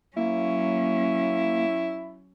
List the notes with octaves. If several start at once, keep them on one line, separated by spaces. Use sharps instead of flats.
F#3 A#3 C#4 E4